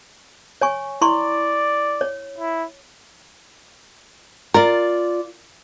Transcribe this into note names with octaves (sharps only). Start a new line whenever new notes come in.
C#5 G#5 C#6
E4 D5 C6 C#6
C#5
E4
F4 A#4 D5